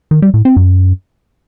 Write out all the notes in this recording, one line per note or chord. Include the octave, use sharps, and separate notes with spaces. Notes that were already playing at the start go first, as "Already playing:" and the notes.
D#3
G3
A2
C4
F#2